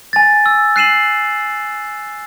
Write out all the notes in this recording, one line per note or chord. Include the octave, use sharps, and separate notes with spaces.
G#5 A6
E6
F#6 C7 D#7 E7 F#7